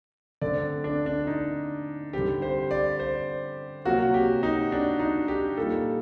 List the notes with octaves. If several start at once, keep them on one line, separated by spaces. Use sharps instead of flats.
D3 A3 C4 D5
D4
D4
D#4
D3 G3 C4 G4
C5
D5
C5
C3 F#3 A#3 F#4
G4
D#4
D4
D#4
G4
A#2 G3 A#3 A4